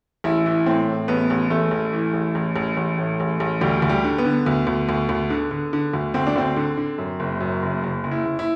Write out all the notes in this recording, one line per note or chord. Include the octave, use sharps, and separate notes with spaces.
A1 E4
E3
A2 C4
A2
A1 B3
A1
A1 A3
A1
E3
A1
A1
A1
A1
A2
A1
A1
D2 G3
D2
G3
D3
B3
D3
D2
D2
D2
D2
D3
D3
D3
D2
D2 C4
D4
D2 C4
D3
D3
F#2
F#1
F#2
F#1
F#1
F#1
E4
F#1
E4